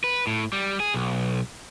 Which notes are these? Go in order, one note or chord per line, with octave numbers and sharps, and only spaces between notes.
B4
A2
G3
G#4
B1